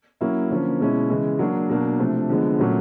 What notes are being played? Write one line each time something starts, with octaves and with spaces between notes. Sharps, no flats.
F#3 A#3 C#4 E4
D3 F3 A#3 C#4
B2 G#3 C#4 E4
C#3 E3 G#3
F#3 A#3 D4
B2 F#3 A#3 D4
C3 F3 A3 D4
D3 F3 G#3 B3
A#2 F#3 A3 C#4